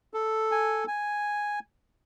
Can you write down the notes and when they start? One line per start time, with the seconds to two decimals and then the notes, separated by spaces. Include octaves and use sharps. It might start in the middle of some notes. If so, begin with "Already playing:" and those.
0.14 A4
0.52 G#5
0.88 G#5